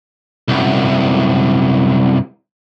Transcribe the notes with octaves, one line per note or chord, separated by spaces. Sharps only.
C2 F#2